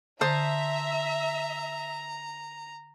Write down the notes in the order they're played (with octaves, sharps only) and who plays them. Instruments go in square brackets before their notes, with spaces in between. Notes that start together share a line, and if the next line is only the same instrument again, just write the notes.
[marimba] D3 [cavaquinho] C5 A5 D#6 [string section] E5 [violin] A#5